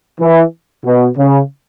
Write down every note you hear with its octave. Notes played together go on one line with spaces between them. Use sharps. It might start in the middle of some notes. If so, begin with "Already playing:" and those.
E3
B2
C#3